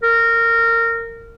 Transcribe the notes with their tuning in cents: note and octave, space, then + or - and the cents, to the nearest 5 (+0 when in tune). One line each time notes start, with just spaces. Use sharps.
A#4 -20